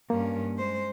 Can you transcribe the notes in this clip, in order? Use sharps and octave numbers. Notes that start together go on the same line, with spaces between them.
G2 A#3 C#4
G#3 C5